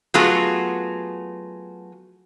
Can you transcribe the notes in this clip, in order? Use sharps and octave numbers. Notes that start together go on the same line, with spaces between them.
F#3 A3 B3 F4 F#4 G#4